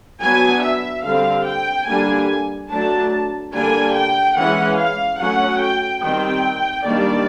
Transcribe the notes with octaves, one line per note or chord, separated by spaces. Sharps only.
F#3 B3 D4 G#5
E5
D3 G3 C4 F5
G5
D3 G3 A#3 D4 G#5
F#3 A3 D4 A5
D3 G3 A#3 D4 G#5
G5
E3 G#3 C#4 F#5
F5
F#3 A3 C#4 F#5
G5
D#3 G3 C4 G5
D#3 G3 A#3 D4 D5